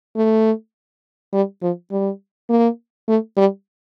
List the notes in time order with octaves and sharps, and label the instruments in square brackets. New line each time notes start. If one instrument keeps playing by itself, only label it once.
[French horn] A3
G3
F3
G3
A#3
A3
G3